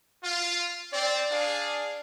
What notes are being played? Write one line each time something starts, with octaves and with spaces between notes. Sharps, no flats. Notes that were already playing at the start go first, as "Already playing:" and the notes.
F4
C4 D5
D4 G#4 F5